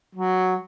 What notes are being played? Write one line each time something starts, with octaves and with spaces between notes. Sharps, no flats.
F#3